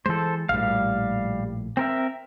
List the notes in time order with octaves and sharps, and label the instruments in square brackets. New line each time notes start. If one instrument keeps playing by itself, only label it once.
[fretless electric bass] E3 G#3 [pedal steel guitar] A4 C5
[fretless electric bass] A#1 A2 [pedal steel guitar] G3 F5
[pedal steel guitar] C4 A#4 E5